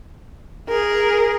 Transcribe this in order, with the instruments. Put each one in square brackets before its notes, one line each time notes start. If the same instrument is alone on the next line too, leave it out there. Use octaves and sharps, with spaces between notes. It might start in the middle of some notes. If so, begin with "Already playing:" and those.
[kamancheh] G#4 A#4